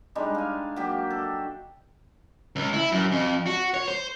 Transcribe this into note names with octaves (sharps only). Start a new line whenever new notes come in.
G3 G#3 D4 D#4
F5 G#5
F#3 A#3 G4
A4
C#2
E4
F#2
F2
F#4
C#5
C5